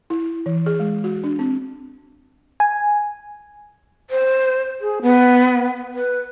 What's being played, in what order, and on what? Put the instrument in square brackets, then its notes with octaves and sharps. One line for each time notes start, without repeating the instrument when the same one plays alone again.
[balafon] E4
E3
G#4
G#3
F#4
D4
C4
[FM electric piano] G#5
[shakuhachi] C5
G#4
B3
B4